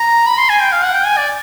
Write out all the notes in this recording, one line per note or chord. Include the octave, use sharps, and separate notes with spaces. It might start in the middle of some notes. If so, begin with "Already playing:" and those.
Already playing: A#5
B5
C6
G#5
G5
F5
F#5
G5
G#5
D5